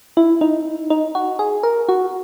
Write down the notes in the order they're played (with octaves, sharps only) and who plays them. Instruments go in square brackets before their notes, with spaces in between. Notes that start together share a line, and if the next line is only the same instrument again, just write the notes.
[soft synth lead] E4
D#4
D#4
F#4
G#4
A#4
F#4